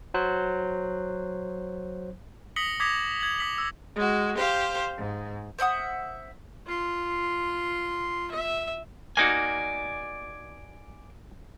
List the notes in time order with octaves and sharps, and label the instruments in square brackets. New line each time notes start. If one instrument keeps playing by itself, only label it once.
[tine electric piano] F#3 C5 F#6
[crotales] D#6 A#6 B6 C#7 F#7 G7
D6 D#6 G#6 A#6 B6 F7
G#6 F#7
D#6 B6 F#7
E6
[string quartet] G#3 F#4
G4 C5 F5
G#2
[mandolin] C5 E5 F#5 D#6
[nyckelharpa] F4 C6
E5
[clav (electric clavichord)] A#3 D#4 F#4 [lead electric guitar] D5 G#5